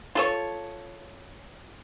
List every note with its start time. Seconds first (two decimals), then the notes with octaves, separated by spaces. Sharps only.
0.15 F4 A4 C#5